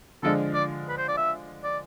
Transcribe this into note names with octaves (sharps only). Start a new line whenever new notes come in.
D3 F3 G#3 D4 F4 A4
D5
B4
C5
D5
E5
D5